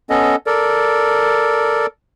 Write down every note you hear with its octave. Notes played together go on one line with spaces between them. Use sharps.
B3 C#4 A4 D#5
A4 A#4 D5